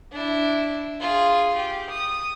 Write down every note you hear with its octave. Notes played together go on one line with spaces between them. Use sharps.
D4 E4
F4 G#4
G4
D#6